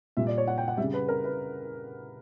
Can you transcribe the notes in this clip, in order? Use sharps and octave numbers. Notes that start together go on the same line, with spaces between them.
A#2 G3 E5
D5
C#5
F#5
G5
F#5
G3 E5
C#3
B4
A#4
B4